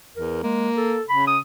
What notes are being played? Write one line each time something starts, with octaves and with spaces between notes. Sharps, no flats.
E2 A#4
G#3 A#3
A4
C#3 B5
D#6